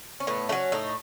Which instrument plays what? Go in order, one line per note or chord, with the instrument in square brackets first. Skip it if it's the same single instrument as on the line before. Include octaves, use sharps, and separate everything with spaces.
[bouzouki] C#4
A2 B3
F#3 A3 C#4
A2 D#4